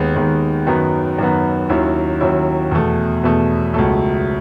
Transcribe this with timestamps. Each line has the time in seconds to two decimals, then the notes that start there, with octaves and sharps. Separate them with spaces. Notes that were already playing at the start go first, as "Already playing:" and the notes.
Already playing: D#2 D#3 G#3 B3
0.15 D#2 D#3 G#3 B3
0.67 F#2 D#3 F#3 B3
1.18 F#2 D#3 F#3 B3
1.69 D#2 D#3 F#3 C#4 E4
2.20 D#2 D#3 F#3 C#4 E4
2.71 E2 B2 A3
3.24 E2 B2 A3
3.74 C#2 B2 F#3 A3